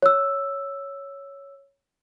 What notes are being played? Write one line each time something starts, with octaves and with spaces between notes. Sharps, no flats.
C#5 E6